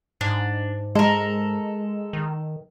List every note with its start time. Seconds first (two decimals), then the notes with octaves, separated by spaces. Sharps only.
0.21 G#2 D4
0.95 G#3 A4 A#4
2.13 D#3